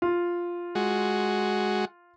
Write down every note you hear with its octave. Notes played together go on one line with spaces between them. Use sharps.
F4
G#3 F#4